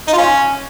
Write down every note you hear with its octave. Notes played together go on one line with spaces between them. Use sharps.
D#4
F4
C#4